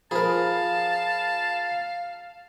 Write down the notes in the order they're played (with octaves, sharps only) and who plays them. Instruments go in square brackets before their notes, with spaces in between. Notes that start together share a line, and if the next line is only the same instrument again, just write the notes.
[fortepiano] F3 C5 B5 [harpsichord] G#4 A#4 [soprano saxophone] F5 [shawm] A5